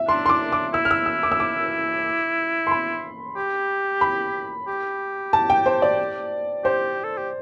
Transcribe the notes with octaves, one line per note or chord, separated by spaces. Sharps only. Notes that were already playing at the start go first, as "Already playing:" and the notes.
Already playing: E5
D4 C6
C6
D6
D6
E4 E6
F6
E6
E6
D6
E6
D6
C6
B5
G4
B5
G4
A5
G5
C5
D5
G4 C5
A4
G4